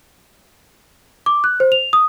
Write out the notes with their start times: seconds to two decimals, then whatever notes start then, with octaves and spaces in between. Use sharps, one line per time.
1.26 D6
1.44 F#6
1.60 C5
1.72 F7
1.93 D#6